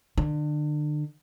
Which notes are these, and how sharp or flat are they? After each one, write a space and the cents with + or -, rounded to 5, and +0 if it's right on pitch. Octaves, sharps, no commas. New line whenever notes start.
D3 +35